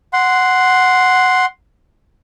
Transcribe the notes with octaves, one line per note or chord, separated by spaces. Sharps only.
F#5 C6